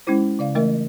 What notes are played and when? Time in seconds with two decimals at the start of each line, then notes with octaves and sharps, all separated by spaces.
0.07 G#3 C#4 D#4 E4 C5
0.39 C#3 D5 F5
0.55 E3 A3 D#4 A#4 D#5 E5